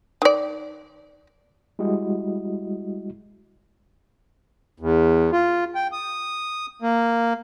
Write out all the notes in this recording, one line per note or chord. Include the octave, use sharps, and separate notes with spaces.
D#3 D5
G3 G#3 E4 F#4 D#5
E2
F4
G5
D#6
A#3